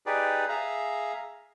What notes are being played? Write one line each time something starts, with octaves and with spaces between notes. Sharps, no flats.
D#4 G4 G#4 B4 D5
G#4 E5 F5 A#5